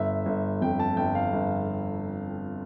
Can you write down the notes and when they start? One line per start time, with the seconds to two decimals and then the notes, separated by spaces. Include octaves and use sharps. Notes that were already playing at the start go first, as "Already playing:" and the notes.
Already playing: G1 E5
0.26 G1
0.61 F2 G5
0.79 A5
0.97 G1 G5
1.15 F5
1.33 G1